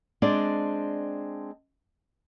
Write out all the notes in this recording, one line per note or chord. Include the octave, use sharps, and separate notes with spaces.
G#3 C4 D4 D5